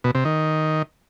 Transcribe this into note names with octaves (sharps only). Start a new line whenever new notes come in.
B2
C3
D#3